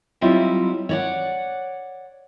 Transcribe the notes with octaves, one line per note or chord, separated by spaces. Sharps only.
F#3 G3 C4 E4 F4 D#5
C#5 D5 F#5